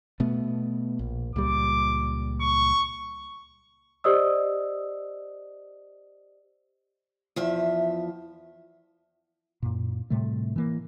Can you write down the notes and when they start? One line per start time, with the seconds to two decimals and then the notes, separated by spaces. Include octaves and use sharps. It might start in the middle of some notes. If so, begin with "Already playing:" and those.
0.20 B2 A3 B3
0.99 A#1
1.36 C#2 A#2 G3 D6
2.41 C#6
4.04 G4 C5 D5 D#5 D#6 E6
7.36 E2 F3 E5
9.63 F#2 A#2
10.10 A2 C3 G3 A3
10.56 E3 A#3